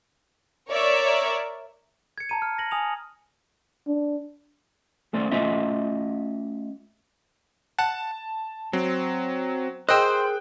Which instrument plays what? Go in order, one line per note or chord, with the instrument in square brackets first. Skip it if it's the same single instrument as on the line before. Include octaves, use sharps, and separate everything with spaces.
[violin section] A#4 C#5 D5 E5
[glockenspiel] G#6 C#7
A5 A#5 D#7
F6
A#6 F#7
G#5 D#6 F7
[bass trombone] D4
[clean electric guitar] A3 C#4 C5 D5
A3 C#4 F4 D#5 E5
[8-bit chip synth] F#5 [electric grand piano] A5
[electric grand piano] F#3 [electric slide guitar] C4
[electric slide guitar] G#4 A#4 [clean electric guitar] C5 [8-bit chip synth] D#5 E6 [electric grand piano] G5 F#6